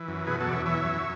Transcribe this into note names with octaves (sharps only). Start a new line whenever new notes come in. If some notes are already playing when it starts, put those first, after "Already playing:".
Already playing: E3
F#2
B2 G#4 B4
F#4 A4
E2 D5
C#5 E5
E3 C#5 E5
F#2